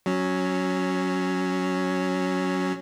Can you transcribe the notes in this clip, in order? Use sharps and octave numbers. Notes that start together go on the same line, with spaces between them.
F#3 C#4